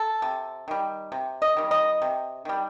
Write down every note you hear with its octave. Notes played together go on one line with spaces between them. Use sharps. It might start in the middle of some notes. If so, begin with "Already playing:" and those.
Already playing: A4
C3
D#3 G3
C3
D#5
D#3 G3
D#5
C3
D#3 G3